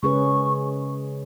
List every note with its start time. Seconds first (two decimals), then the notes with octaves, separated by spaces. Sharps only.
0.03 C#3 G#3 C#4 G#4 B4 C#6